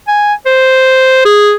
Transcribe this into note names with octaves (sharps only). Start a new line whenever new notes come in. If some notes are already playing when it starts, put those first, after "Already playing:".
G#5
C5
G#4